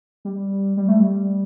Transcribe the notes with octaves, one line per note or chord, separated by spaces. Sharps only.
G3
G3
A3
G3